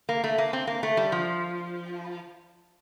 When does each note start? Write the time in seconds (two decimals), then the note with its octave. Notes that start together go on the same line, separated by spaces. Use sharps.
0.09 A#3
0.24 A3
0.38 A#3
0.53 C4
0.67 A#3
0.83 A3
0.97 G3
1.12 F3